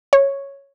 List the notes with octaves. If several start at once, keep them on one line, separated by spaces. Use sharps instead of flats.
C#5